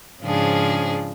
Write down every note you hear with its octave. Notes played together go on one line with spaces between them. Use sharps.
G#2 C#3 F3 D4 G#4